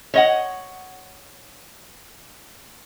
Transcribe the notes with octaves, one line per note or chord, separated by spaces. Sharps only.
C#5 D#5 F#5